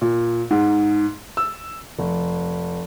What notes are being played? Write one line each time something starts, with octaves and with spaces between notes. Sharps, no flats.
A#2
G#2
E6
F1